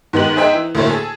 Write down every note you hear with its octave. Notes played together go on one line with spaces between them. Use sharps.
G#2 D#3 B3 D#4 G4 F#7
D#4 G#4 C5 D#5 E5 G5
E3
D2 A2 A#3 E4 C5 C#5
G#4 A4